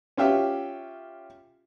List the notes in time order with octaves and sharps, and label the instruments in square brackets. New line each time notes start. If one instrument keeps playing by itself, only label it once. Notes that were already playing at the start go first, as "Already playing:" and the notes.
[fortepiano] C#4 F4 G4 E5